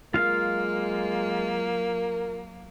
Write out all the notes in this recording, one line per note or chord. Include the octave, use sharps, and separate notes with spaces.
F#3 G#3 A#3 F4 A#4 F5